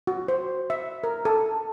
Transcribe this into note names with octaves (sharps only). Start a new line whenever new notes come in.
F#4
C5
E5
A#4
A4